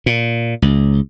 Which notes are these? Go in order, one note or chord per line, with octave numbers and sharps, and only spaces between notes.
A#2
C#2